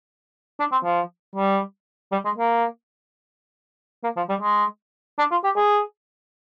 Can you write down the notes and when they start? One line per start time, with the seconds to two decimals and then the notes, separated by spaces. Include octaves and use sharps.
0.60 D4
0.72 C4
0.84 F3
1.35 G3
2.12 G3
2.25 G#3
2.38 A#3
4.03 A#3
4.16 F3
4.29 G3
4.41 G#3
5.18 D4
5.31 F4
5.44 G4
5.56 G#4